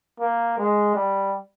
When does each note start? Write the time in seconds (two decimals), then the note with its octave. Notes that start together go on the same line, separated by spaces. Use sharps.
0.20 A#3
0.58 G#3
0.95 G3